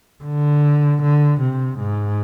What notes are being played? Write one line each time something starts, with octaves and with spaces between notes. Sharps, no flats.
D3
D3
C3
G#2